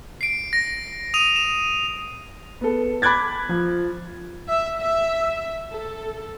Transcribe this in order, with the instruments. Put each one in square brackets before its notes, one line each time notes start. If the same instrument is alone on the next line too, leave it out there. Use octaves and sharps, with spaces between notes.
[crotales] C7 D7
A#6
D#6 D#7 F7
E7
[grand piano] B3 A4
B5 D6 F#6 G#6 A6
F3
[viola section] E5
E5
A4